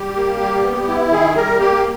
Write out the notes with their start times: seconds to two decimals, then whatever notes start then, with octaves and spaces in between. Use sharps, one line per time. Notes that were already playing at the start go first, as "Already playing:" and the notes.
Already playing: G3 G4
0.16 A#3
0.40 G3
0.63 B3
0.88 E4
1.11 D#3 G#4
1.36 G3 A#4
1.59 A#3 G4